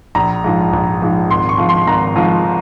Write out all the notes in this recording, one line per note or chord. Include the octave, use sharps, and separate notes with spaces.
A#1 A#5
G#2 F3
A#1
G#2 F3
G#1 C6
C#6
G#2 F3
C6
G#1 A#5
G#2 F3